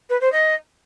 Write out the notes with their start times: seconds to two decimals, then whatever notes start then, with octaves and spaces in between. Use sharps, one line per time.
0.10 B4
0.21 C5
0.32 D#5